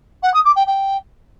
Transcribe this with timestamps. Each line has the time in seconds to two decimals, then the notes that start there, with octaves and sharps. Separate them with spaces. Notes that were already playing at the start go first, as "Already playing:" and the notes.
0.23 F#5
0.34 D#6
0.45 D6
0.56 G5
0.67 G5